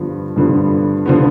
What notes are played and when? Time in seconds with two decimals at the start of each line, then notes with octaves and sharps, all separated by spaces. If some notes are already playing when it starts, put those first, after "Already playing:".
Already playing: G2 D3 F3 B3
0.36 G2 D3 F3 B3
1.06 D3 F3 B3